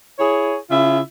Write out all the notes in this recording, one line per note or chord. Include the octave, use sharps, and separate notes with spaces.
E4 G#4 C#5
C#3 E4 F4 E5